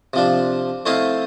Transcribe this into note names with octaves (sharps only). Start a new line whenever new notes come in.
C3 F3 D4
A3 C4 E4 D#5 F5